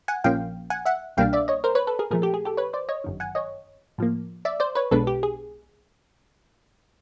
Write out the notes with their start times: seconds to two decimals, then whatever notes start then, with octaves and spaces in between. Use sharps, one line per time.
0.08 F#5 G#5
0.24 A#1 A#2 F3 A#3 C#4 F5 G5
0.70 F#5 G#5
0.86 E5 F#5
1.17 C2 B2 G3 A#3 D4 F5 G5
1.33 D5 E5
1.48 C#5 D#5
1.64 A#4 C5
1.75 B4 C#5
1.87 A4 B4
1.99 G#4 A#4
2.11 A#2 F3 A3 G#4 A#4
2.22 G4 A4
2.34 G#4
2.45 G4 A4
2.57 B4 C#5
2.73 C5 D5
2.89 C#5 D#5
3.04 G1 F#2 D#3
3.20 F#5 G#5
3.35 C#5 D#5
3.98 A2 F3 A#3
4.45 D5 E5
4.60 C5 D5
4.75 B4 C#5
4.91 B1 B2 G#3 B3 D4 A4 B4
5.07 G4
5.23 G#4